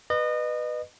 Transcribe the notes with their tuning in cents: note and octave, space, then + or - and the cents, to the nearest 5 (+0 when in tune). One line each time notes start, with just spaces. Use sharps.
B4 +0 D#5 -30